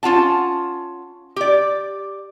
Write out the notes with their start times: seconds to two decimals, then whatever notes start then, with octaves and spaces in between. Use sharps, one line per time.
0.03 C#4 F4 F#5 A5
1.36 G4 D5